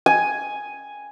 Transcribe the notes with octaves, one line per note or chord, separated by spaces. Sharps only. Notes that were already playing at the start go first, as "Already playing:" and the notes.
G#5